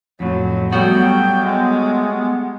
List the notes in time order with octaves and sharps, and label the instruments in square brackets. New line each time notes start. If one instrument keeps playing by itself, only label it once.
[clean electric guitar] F2 A2 [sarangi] F#3
[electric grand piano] F#3 G3 A3 [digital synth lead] B3 [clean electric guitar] F#4 [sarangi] G5
[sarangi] G#3